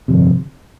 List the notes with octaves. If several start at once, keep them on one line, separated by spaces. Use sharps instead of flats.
G1 F2 C3